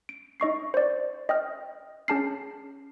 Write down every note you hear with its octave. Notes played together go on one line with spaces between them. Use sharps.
D7
D#4 D#5 C#6 C7
C5 D5
D#5 G5 D#6 F6
C#4 G#4 A5 F6 C7